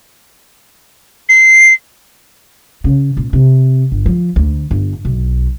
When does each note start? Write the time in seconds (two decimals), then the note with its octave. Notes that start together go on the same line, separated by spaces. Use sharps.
1.29 C7
2.84 C#3
3.17 A#2
3.33 C3
3.92 G1
4.06 F3
4.36 D2
4.71 G1
5.05 B1